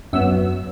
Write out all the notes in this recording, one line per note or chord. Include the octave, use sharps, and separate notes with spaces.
F#2 F#3 B3 E6